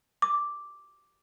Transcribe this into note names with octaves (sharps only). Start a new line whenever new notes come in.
D6